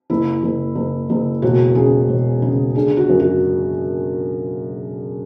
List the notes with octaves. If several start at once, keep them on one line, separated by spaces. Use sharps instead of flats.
F#1 E4
F#1
F#1
F#1
E1 F#4
C#3 G#4
E1
C#3
D3 G#4
F#4
F#2
F#4